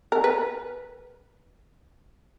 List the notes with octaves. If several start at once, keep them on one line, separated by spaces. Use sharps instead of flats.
A#4
B4